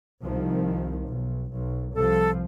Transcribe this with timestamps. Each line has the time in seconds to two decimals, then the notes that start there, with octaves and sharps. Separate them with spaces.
0.23 C2 D#3 F3
1.08 B1
1.54 B1
1.96 C2 F3 A4